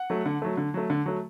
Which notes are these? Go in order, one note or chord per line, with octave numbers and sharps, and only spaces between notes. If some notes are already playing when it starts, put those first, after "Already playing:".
Already playing: F#5
F#3 A3
D3
F#3 A3
D3
F#3 A3
D3
F#3 A3